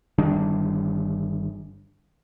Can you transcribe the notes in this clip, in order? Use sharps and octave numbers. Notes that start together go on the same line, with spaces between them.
G1 D#3 G3 D4